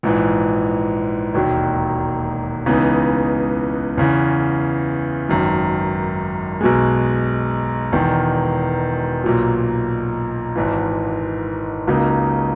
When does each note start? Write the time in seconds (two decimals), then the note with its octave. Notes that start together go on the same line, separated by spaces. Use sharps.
0.03 A#1 G#2 E3
1.34 E1 D#2 D#3 F#3
2.66 C#2 C#3 E3 B3 D#4
3.98 E2 C#3 E3
5.29 G#1 F#2 D#3
6.61 B1 B2 G#3
7.92 E1 E2 D#3
9.24 B1 A#2 F#3
10.56 G#1 G#2 E3
11.87 C#2 C#3 F#3 A#3 D#4